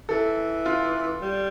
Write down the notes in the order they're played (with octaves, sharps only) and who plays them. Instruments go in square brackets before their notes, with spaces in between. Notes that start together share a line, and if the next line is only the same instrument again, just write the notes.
[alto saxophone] E3 [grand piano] A4
[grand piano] F4
[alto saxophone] G3